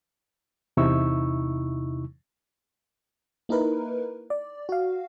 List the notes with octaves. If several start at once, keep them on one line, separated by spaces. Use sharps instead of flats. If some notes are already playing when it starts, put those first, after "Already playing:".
E2 C3 D#4 E4 C#6 E6
A#3 D#4 E4 A#4 B4
D5
F#4 F5